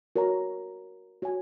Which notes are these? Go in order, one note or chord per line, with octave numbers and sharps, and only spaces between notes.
F#4 A#4 C#5 A#5
F#4 C#5 G#5